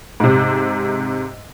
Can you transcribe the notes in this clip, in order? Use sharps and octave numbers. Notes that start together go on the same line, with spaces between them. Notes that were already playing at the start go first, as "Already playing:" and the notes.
G#2 C3